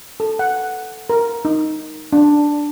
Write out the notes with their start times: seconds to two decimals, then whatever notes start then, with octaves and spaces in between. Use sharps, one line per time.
0.20 A4
0.39 F#5
1.10 A#4
1.45 D#4
2.13 D4